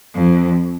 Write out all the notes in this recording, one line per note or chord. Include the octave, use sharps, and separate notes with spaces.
F2